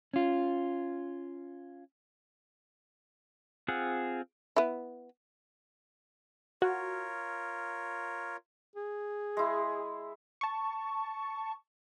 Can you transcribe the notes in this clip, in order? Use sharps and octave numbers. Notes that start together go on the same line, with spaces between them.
C#4 F4
C4 F4 G#4 F#5
B3 E4
F4 F#4 A#4 C#5
G#4
G#3 E4
A5 C#6